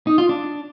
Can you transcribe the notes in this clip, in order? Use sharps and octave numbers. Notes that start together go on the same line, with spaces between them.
D#4
F4
D4